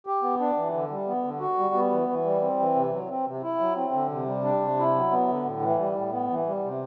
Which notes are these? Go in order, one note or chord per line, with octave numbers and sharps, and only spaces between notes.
G4
B3
D4
E3
D3
G3
B3
D3
F#4
G3
B3
E3
E3
G3
C4
E3
C3
F#3
C4
C3
E4
F#3
C4
D3
C3
G3
D4
C3
E4
F#3
B3
D3
A2
E3
G3
A2
B3
E3
G3
C3